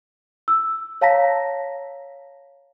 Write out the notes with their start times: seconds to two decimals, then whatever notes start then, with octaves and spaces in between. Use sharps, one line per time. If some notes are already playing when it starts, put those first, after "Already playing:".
0.48 E6
1.01 C#5 F5 A5 A#5 A#6 B6